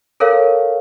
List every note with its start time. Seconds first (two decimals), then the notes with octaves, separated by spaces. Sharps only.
0.20 A4 A#4 C#5 F5